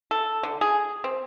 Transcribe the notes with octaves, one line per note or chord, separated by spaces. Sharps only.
A4
D3
G#4
C4